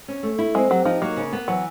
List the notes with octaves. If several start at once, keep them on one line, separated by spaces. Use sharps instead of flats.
C#4
A3
E4
G#3 C4
F#3 G4
F3 D#4
F#3 A#3
C#3
B3
E3 F#3